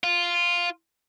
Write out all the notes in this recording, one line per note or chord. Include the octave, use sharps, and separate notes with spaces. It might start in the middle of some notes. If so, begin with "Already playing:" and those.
F4